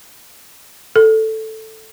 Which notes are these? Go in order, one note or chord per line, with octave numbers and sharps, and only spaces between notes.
A4